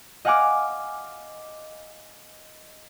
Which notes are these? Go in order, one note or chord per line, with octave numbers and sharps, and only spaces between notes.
D#5 F5 F#5 G#5 D6 F6